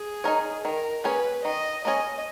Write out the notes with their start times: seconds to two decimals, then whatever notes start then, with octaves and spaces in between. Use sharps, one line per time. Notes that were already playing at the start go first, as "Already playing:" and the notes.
Already playing: G#4
0.24 D#4 A#4 C#5
0.64 D#3 A#4
1.04 A#3 C#4 G#4 B4 C#5
1.45 D#3 D#5
1.85 A#3 C#4 G#4 C#5 D#5